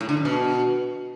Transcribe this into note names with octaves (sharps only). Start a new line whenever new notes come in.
A2
D3
F#2
B2